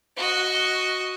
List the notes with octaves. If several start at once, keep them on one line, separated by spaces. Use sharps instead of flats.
F#4 D#5